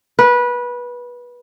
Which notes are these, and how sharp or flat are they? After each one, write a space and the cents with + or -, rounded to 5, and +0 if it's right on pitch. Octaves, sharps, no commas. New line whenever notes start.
B4 -20